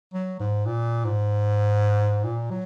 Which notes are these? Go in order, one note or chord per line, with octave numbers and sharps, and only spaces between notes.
F#3
G#2
A#2
G#2
A#2
F#3